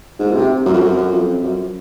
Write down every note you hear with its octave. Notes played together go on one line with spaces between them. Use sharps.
G#2
A#2
C3
F#2
F2
F#2
F#2
F2
F#2